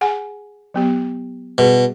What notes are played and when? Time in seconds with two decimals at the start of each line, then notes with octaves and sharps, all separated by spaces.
0.01 G#4 F#5 G#5
0.74 F#3 B3 G4
1.58 B2 G3 G#4 B4